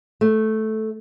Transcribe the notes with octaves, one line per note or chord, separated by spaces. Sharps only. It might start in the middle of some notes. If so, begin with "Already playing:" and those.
A3